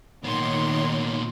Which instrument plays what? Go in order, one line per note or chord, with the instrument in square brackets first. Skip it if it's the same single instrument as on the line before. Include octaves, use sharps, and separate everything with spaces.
[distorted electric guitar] A#2 B3 [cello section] D#3 [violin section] C#5 C6